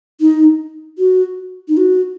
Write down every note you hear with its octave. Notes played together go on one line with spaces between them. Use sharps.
D#4
F#4
D#4
F#4